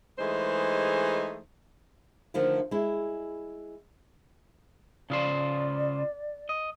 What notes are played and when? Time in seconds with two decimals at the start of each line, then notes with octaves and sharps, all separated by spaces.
0.19 E3 G#3 A3 D#4 G#4 C5
2.34 D3 D#3 F3 A3 A#3
2.71 G#3 E4
5.10 C#3 F4 C5 D5
6.49 D#5